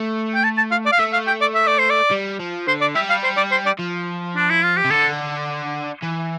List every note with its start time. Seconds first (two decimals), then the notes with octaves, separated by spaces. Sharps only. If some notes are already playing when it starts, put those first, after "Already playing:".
Already playing: A3
0.34 G5
0.44 A5
0.57 A5
0.71 F5
0.86 D5
0.92 F5
0.99 A3 E5
1.13 F5
1.27 G5
1.41 D5
1.55 E5
1.67 D5
1.78 C5
1.90 D5
2.11 G3
2.39 F3
2.67 D3 C5
2.81 D5
2.95 G3 E5
3.10 F5
3.24 C5
3.36 D5
3.51 C5
3.66 D5
3.79 F3
4.36 D4
4.50 E4
4.64 F4
4.77 G4
4.85 C3
4.90 D3 A4
6.03 E3